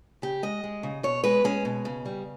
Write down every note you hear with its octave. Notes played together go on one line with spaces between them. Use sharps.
C#3 G4
G#3 D#5
G#3
C#3
B2 C#5
G#3 B4
G#3 C#4
B2
C#3
G3